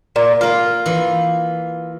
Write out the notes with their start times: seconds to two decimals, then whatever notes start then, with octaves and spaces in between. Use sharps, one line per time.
0.16 A#2
0.41 A#3 F4 A#4
0.86 E3